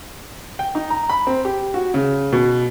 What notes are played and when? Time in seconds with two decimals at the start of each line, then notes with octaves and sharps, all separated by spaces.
0.59 G5
0.75 D#4
0.90 A#5
1.10 B5
1.27 C4
1.45 G4
1.74 F#4
1.94 C#3
2.32 B2